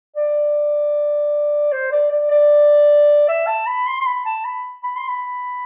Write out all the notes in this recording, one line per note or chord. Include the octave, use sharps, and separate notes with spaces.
D5
C5
D5
D5
D5
E5
A5
B5
C6
C6
B5
A5
B5
B5
C6
B5